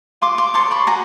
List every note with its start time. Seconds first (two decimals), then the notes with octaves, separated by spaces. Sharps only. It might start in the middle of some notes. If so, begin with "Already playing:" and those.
0.22 F4 C6 D6
0.38 C6 D6
0.54 A4 C#5 C6 D6
0.71 B5 C#6
0.87 F#4 G#5 A#5